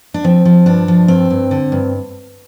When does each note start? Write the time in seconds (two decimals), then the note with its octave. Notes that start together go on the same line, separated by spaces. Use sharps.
0.14 D4
0.24 F3 C4
0.45 F3
0.66 G2 D4
0.88 F3
1.08 G2 C4
1.31 G2
1.51 D3
1.72 G2